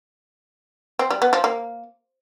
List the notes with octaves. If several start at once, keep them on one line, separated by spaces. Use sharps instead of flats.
C4
G3
B3
F3
A#3